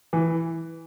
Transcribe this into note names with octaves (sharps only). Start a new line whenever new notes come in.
E3